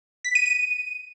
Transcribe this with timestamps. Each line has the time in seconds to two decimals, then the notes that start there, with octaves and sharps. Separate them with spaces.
0.24 B6
0.35 D#7
0.46 D#7